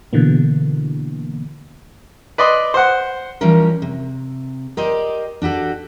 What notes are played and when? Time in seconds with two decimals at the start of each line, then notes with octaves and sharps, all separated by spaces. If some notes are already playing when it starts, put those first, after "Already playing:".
0.13 B2 D3 E3 A#3
2.38 B4 D5 D#5 C6
2.74 C5 F#5
3.41 E3 F3 G3 C#4 A#4
3.82 C3
4.77 G4 A#4 C5 D5 D#5
5.42 D4 F#4 G4 A4